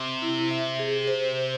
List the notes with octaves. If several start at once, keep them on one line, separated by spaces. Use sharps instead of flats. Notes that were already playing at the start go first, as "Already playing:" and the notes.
Already playing: C3
E4
E5
G#4
C5